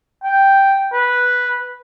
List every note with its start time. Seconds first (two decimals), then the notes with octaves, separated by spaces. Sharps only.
0.24 G5
0.93 B4